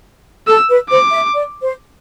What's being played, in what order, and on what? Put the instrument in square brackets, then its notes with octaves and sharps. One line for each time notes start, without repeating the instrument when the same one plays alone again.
[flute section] A4 [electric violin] E6
[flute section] B4
[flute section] C5 [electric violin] D6
[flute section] E5
D5
C5